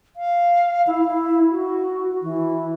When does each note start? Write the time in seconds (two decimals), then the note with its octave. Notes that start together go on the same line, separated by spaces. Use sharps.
0.16 F5
0.87 E4
1.05 E4
1.50 F#4
2.22 E3